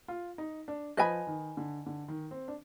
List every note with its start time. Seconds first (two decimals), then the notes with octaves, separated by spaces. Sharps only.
0.08 F4
0.38 D#4
0.68 D4
0.97 F3 B4 D#5 G#5 B5
1.27 D#3
1.57 D3
1.86 D3
2.08 D#3
2.31 C4
2.48 D4